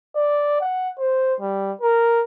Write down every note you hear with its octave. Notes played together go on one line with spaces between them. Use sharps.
D5
F#5
C5
G3
A#4